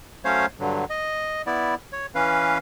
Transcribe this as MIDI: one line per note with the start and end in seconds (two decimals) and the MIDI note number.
0.25 0.46 54
0.25 0.46 57
0.25 0.46 61
0.25 0.46 72
0.25 0.46 73
0.25 0.46 77
0.60 0.85 43
0.60 0.85 50
0.60 0.85 54
0.90 1.42 75
1.47 1.75 59
1.47 1.75 64
1.47 1.75 74
1.93 2.06 73
2.15 2.58 52
2.15 2.58 61
2.15 2.58 71
2.15 2.58 77